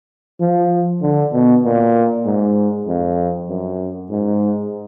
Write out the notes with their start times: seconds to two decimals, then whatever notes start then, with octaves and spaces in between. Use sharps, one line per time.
0.41 F3
1.02 D3
1.33 B2
1.64 A#2
2.26 G#2
2.87 F2
3.49 F#2
4.10 G#2